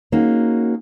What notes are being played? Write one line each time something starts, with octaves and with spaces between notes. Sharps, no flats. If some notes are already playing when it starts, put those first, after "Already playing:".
A#3 C#4 D#4 F#4 G#4